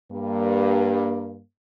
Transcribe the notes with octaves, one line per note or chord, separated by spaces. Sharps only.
G2 A#3